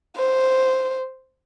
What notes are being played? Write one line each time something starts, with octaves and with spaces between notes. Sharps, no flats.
C5